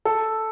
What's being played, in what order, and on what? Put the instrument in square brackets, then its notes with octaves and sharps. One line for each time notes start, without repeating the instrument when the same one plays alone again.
[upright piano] A4